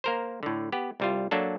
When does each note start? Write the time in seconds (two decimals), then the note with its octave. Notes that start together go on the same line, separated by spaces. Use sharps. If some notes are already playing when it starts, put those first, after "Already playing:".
0.04 A#3 A#4 C5
0.43 A2 D3
0.72 B3 G4
1.00 C2 G3 F4
1.31 F#3 A#3 D4 A4